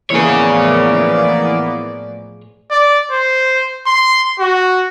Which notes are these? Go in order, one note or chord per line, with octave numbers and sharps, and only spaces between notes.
A2 E3 F3 A#3 B3 G#4 C#5 D5
D5
C5
C6
F#4